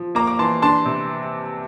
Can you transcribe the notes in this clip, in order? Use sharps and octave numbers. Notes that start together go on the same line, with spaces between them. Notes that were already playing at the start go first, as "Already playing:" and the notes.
Already playing: F3
A#3 A#5 D6
D6
E3 A5 C6
D4 A5 C6
C3